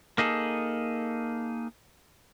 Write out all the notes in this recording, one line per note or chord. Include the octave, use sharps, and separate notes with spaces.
A#3 D#4 G#4 A4